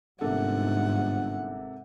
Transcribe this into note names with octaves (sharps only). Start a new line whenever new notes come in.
G1 G#2 C3 A#3 A4 F#5